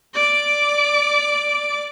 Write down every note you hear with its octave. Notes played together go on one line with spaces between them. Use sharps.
D5 D6